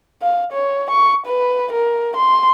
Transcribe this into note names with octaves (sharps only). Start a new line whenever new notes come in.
F5
C#5
C#6
B4
A#4
C6